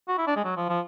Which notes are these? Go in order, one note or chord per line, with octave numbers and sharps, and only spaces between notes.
F#4
E4
D4
G#3
F#3
F3
F3